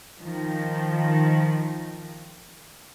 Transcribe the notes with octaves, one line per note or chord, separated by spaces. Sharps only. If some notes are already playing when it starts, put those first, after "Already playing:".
D#3 F3